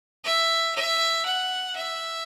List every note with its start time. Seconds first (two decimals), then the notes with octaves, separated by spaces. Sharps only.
0.24 E5
0.75 E5
1.25 F#5
1.76 E5